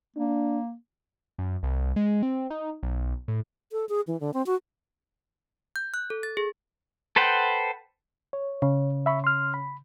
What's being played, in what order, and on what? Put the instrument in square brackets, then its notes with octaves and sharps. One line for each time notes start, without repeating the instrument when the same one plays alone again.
[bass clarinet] A#3 [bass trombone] D4
[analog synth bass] F#2
C2
G#3
C4
D#4
B1
A2
[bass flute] A4
G#4
E3
D3
C4
F#4
[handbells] G6
F#6
A4
A6
G#4
[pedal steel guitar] A4 B4 C5 F#5 G5
[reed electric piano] C#5
[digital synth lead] C#3
[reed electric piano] E5 B5 C#6
C6 F6
B5